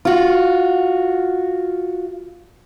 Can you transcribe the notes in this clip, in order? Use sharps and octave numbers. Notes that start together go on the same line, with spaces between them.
F4 F#4